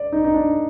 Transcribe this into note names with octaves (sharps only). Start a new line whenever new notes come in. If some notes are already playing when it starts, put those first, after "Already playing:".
Already playing: D5
D#4
D#4
D4